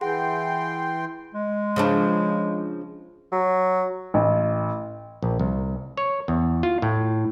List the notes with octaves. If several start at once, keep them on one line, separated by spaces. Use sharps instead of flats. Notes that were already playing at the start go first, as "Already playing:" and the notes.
E3 G#4 F#5 G5 C6
G#3
C#3 F3 D4
F#3
A1
A#1
C2
C#5
E2
F4
A2